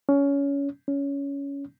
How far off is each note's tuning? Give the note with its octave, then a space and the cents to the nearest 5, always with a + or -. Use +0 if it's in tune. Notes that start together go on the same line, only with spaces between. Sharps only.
C#4 +20
C#4 +15